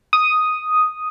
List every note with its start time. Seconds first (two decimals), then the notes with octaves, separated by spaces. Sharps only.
0.13 D#6